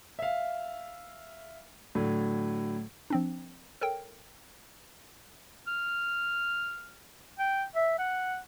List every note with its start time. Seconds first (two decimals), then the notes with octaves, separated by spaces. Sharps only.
0.19 E5 F5
1.95 A2 D3 F#3
3.10 F3 C4 D4
3.81 A4 A#4 C#5 G5
5.67 F6
7.39 G5
7.75 E5
7.99 F#5